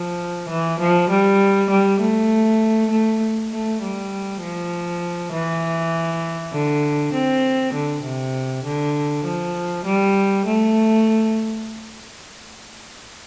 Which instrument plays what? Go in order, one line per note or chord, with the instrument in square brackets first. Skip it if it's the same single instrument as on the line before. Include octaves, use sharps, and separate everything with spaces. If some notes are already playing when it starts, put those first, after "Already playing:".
Already playing: [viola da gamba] F3
E3
F3
G3
G3
A3
A3
A3
G3
F3
E3
D3
C4
D3
C3
D3
F3
G3
A3